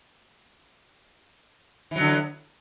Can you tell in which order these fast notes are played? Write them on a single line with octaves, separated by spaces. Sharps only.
E3 F#3 D3